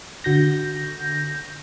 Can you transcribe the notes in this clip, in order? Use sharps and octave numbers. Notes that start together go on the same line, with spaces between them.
D3 F#4 G6 A#6